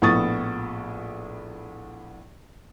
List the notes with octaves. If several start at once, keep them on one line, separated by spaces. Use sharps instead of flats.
A#1 A2 B3 C#6 D#6 A6